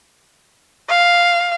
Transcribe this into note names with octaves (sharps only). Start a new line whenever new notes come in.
F5